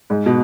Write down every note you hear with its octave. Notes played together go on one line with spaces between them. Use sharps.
G#2
B2